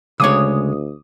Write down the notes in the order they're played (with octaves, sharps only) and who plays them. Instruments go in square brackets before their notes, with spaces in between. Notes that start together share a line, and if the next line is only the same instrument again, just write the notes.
[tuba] D2 [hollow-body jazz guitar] C#3 G#3 C#5 [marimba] D6 [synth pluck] D#6